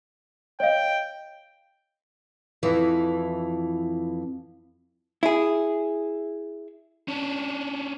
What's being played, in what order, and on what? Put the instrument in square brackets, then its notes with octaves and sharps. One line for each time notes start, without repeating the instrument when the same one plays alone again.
[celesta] C#5 D#5 F5 [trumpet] G5
[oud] F2 E3
[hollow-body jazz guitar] E4 G#4
[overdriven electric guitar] C#4 D4